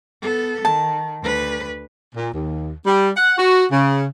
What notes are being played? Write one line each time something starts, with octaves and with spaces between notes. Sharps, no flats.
B3 A4
D#3 A5
D2 B4
A#2
D#2
G3
F#5
F#4
C#3